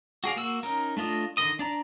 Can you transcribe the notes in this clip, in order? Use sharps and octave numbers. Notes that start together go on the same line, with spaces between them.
F#4 G#4 D5 F5
A#3 F#4 E6
C#4 D#4 A#4
A3 D4 F4 D#5
D3 D#3 D#5 D#6
D4 D5 A#5